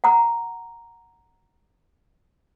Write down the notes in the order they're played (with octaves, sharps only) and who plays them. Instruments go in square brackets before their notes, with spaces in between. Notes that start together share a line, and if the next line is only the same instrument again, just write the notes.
[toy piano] F#5 A#5